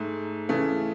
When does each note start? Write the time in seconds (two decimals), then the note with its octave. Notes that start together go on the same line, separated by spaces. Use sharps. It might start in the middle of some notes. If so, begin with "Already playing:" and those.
Already playing: G#2 A3
0.49 C#3 E3 A3